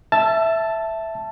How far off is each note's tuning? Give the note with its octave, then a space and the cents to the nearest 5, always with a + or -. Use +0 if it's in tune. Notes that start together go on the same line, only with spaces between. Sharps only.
E5 +0 A5 +0 E6 +30